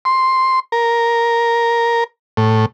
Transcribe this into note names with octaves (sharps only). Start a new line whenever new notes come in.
C6
A#4
A2